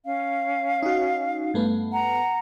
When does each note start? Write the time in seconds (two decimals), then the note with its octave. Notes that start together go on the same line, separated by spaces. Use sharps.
0.05 C#4 F5
0.83 D#4 F#4
1.54 G2 A3 B3
1.92 F#5 A#5